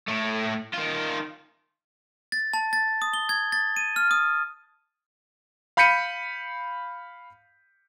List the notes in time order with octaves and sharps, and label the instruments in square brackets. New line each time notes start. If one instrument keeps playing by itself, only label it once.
[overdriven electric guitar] A2 A3
D#3 F4
[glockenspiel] A6
A5
A6
D#6
G7
G#6
A6
D#7
F6
D#6
[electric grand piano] F5 B5 G6 B6 C#7 D#7